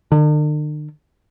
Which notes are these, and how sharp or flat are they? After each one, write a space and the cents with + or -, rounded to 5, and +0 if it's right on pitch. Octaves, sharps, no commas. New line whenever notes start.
D3 +45